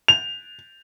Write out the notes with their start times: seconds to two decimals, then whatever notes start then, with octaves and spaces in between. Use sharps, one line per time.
0.08 F7